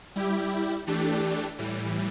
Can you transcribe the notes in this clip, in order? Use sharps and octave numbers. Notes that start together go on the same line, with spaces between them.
G3 E4 G4
E3 A3 D4 G4
A2 E3 G3